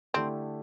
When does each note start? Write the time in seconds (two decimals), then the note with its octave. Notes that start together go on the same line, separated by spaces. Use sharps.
0.14 D3 A3 C4 E4 G4